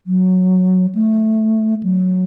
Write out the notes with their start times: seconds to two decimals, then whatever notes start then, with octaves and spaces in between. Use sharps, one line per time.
0.07 F#3
0.95 A3
1.83 F#3